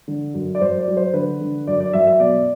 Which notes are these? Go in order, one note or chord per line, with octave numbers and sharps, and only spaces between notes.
D3
F#2
D5
F#2 C5
D5
F#3
C5
D3 B4
D3
F#2 D5
D5
F#2 E5
E5
B2 D5